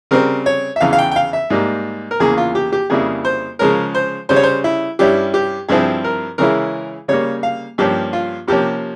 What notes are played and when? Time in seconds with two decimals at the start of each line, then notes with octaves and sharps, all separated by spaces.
0.11 C#3 G3 C4 A#4
0.46 C#5
0.76 E5
0.80 E2 C#3 E3 F5
0.93 F5
0.98 G5
1.11 G5
1.16 F5
1.33 E5
1.50 G#2 G3 A#3
2.11 A#4
2.20 E2 C#3 E3 A#3 G#4
2.37 F4
2.55 G4
2.72 G4
2.90 F2 C#3 G3 A#3 E4 G#4
3.25 C5
3.59 C#3 F3 G#3 C#4 A#4
3.95 C5
4.29 C#3 G3 C#4 C5
4.36 C#5
4.43 C5
4.64 E4
4.99 G2 G3 C#4 E4 G4
5.34 G4
5.69 G2 F3 C4 E4 G#4
6.04 A#4
6.38 C#3 E3 G#3 C#4 E4 A#4
7.08 C#3 G3 A#3 C#5
7.43 F5
7.78 G2 F3 A#3 C#4 G4
8.13 F4
8.47 C3 F3 A#3 C#4 G4